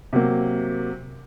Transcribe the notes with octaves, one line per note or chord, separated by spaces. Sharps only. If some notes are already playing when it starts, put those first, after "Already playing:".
C3 F#3 A#3